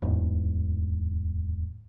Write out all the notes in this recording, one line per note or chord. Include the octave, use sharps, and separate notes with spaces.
D1 E2 G#2